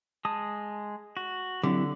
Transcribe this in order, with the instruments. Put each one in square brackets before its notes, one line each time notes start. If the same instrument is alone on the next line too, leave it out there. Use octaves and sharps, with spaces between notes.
[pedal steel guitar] G#3 D#6 [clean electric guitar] A5
[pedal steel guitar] F#4
[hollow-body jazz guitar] D3 [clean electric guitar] F#3 C4 [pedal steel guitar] E4 G4